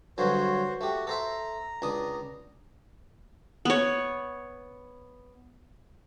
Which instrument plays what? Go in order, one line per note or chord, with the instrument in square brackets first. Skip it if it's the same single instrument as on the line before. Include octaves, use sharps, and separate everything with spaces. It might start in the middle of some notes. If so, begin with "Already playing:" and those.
[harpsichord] G2 D3 F#3 [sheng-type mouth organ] F#4 C5 C#5
[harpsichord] A3 G4 [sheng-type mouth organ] F#4
[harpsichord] A4 C5 E5 [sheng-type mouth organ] A#5
[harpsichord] C#2 D4 D#6
[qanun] B3 C#5